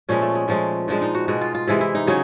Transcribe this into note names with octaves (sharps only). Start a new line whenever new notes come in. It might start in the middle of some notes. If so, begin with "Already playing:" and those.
A#2 F3 G#3 C#4
A3
G#3
A#2 F3 G#3 A3
A#2 F3 G#3 D4
D#4
F#4
B2 G#3 F#4
F4
F4
C3 E3 G#3 E4
E4
D#4
C#3 F#3 C#4